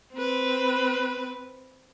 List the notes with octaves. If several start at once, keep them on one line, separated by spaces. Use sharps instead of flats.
C4 B4